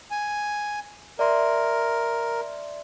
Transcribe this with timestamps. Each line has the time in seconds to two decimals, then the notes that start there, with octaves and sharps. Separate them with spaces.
0.11 G#5
1.19 A#4 D5 E5 C6